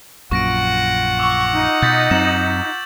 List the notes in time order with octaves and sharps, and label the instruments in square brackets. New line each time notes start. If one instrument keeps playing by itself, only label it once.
[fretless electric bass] A#1 F#2 A#2 [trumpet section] F4 F#5 [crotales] C#6 A#6 D7
[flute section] C#6 [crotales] D6 E6
[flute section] D#4
[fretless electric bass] B2 [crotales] G6 A6 B6
[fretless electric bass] F#2 F#3 C4 [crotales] E7 F#7